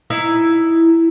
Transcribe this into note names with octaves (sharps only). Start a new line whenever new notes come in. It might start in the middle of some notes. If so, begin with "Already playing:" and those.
D#4 E4 E5